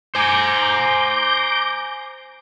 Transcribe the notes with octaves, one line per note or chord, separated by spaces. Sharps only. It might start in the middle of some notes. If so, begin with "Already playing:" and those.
C5 G#5 A#5 D6 G6